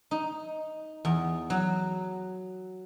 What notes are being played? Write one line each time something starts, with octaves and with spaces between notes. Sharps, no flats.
D#4
E2
F#3